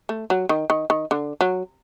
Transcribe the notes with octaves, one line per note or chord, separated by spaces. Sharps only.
A3
F#3
D#3
D#3
D#3
D3
F#3